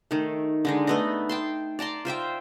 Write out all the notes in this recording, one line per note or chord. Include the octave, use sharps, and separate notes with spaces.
D#3 A3
D3 G#3 D#4
A3 B3 D#5
G5 A5 C6
D5 A5 A#5 C6
F4 C5 E5 G5